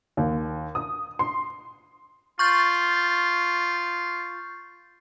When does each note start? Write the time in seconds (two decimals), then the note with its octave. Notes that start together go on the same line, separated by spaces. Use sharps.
0.17 D#2
0.75 D#6
1.19 C6
2.39 F4 C#6 G6 A6